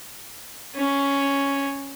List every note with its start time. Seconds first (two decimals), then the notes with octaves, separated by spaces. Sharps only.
0.75 C#4